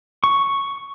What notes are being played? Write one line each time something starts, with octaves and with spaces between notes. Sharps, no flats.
C#6